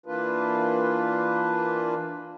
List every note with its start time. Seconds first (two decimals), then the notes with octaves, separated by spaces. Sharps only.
0.06 E3 A#3 D4 F4 B4